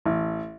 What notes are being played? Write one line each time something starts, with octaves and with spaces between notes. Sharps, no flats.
A1